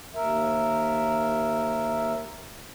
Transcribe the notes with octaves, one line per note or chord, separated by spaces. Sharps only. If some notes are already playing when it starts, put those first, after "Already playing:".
D#2 A#4 E5